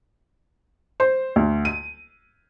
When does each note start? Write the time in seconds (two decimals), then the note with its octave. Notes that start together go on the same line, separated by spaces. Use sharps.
1.00 C5
1.36 D2
1.65 D#7